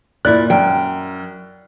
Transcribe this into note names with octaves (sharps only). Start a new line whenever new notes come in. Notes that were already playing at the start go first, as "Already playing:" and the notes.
A#2 E4 D5 F#6
F#2 G5